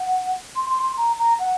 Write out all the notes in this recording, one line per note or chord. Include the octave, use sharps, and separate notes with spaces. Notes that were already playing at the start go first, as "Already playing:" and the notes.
Already playing: F#5
C6
C6
C6
A#5
A#5
F#5